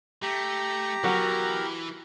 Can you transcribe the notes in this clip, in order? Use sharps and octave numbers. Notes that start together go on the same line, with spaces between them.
A3 G4 A#5
B2 E3 F#3 F#4 A#4 F#5